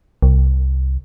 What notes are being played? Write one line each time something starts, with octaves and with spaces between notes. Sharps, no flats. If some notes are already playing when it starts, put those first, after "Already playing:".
C2